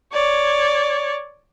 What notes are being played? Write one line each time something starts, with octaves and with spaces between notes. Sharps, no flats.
C#5 D5